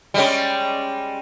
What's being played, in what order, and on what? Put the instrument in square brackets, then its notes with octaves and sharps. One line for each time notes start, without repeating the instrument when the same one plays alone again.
[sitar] G3 G#3 C#4